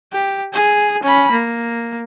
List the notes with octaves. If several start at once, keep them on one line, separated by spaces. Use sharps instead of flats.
G4
G#4
C#4 B5
A#3